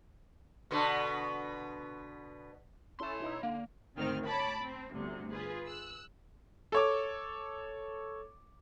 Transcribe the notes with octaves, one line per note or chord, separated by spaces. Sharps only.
B2 D3 B3
C#4 E4 A4 C#5 C6
B2 D#4 E4
D3 A#3 F5
G#1 D2 D#3 C4 F6
C#5 A5 B5 D6
C4
G1 D2 C3
F4 G#4 B4
E6 F#6
A4 C#5 D6